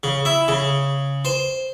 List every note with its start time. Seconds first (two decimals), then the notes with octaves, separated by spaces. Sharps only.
0.03 C#3
0.25 E4
0.48 C#3
1.25 C5